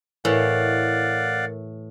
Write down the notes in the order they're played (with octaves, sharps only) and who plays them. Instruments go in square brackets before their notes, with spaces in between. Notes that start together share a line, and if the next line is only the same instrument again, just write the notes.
[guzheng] A2 [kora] E3 [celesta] A#4 [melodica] D5 F5 F#5